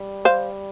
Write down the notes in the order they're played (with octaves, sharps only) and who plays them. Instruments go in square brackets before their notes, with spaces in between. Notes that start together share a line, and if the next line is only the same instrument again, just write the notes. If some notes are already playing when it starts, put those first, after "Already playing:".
Already playing: [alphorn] G3
[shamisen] C5 F5